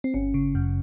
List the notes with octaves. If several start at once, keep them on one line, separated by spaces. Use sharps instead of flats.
C4
G1 C#4
C#3
F#2